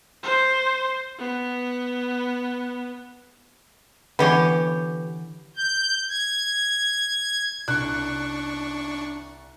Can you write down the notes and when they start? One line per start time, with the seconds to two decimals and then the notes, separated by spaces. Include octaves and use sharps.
0.24 C5
1.19 B3
4.19 D3 E3 B3 G4 C#5
5.57 G6
6.09 G#6
7.68 C2 D4 C#6 F#6